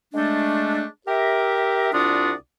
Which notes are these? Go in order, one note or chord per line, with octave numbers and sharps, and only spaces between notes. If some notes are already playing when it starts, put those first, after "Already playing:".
G#3 A3 D4
G4 A#4 E5
C2 D4 F4 F#4 D5 D#6